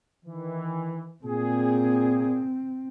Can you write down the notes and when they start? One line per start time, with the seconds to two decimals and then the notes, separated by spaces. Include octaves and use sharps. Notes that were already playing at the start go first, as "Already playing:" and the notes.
0.24 D#3 E3
1.24 A#2 C4 G#4